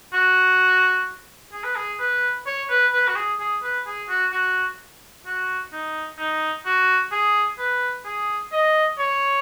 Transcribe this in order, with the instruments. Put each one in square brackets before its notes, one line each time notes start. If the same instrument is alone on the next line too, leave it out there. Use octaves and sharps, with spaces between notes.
[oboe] F#4
G#4
B4
G#4
B4
C#5
B4
B4
F#4
G#4
G#4
B4
G#4
F#4
F#4
F#4
D#4
D#4
F#4
G#4
B4
G#4
D#5
C#5